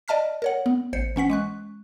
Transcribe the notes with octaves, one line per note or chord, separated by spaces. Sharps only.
D5 D#5 A5 F6 B6
A#4 C#5 F#5
B3
A1 C5 C#7
E3 C#4 F#5 B6
G#3 C#6 F#6